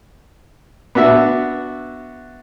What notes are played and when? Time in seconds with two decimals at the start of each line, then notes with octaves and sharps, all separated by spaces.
0.95 B3 D4 F#4 E5